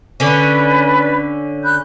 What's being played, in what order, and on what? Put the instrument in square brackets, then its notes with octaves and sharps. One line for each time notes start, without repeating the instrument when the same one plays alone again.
[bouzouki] D3 C#4 [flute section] B4 D5
[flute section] B5 F#6 G6